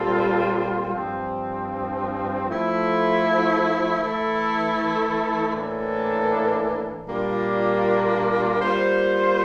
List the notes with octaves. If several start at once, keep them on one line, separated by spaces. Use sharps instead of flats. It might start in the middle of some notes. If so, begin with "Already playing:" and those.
Already playing: A#2 G3 C4 F4 A4
G2 F3 C4
F3 A3 E4 A4
E3 A3 E4 A4
A2 E3 A#3 D4 A4
A#2 G3 A#3 D4 F4
G3 A#3 F4 C5